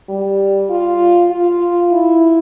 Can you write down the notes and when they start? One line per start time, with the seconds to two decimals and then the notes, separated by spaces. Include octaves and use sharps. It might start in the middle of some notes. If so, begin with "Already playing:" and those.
0.09 G3
0.70 F4
1.31 F4
1.92 E4